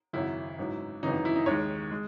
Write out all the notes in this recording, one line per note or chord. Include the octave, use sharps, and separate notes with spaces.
G#1 F#2 C#3 F#3 E4
A1 G#2 F#3
G#1 F#2 C#3 E3 D#4
D#4
E4
D#4
D#2 D#3 G#3 C#5
G#3